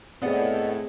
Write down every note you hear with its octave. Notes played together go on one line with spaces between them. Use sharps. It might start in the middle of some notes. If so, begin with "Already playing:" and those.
A2 B3 C4 G#4 D5 D#5 F#5